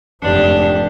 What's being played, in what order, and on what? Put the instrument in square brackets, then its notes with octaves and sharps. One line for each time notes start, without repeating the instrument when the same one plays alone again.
[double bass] F1 G#2 [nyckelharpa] D4 G4